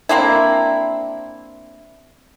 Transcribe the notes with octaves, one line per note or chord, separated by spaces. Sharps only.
A#3 C4 D4 E4